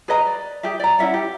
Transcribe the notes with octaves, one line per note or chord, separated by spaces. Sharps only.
G#4 B4 D#5 A#5
D5
G4 G#4 E5
D5 A#5
C#4 E4 E5 F#5
G4